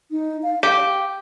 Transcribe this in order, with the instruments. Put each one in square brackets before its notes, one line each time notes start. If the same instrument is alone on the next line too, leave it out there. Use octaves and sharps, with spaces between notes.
[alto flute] D#4
F5
[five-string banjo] G4 [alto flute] F5